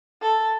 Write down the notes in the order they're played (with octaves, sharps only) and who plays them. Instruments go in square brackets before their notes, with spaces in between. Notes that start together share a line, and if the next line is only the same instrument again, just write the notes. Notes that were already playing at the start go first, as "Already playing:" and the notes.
[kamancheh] A4